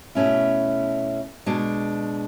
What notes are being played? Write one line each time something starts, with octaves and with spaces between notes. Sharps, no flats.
B2 A3 C#4 E4
B2 G#3 D4